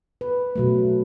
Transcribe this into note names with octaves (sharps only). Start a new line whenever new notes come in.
B4
B2 F#3 A3